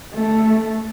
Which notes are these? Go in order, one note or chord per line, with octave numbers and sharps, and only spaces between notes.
A3